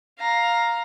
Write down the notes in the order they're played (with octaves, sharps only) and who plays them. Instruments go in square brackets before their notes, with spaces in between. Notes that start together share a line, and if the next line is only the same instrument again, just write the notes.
[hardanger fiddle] F5 A#5